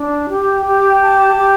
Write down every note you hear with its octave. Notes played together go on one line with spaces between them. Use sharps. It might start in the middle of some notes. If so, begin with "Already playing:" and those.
Already playing: D4
G4
G4
A5
G4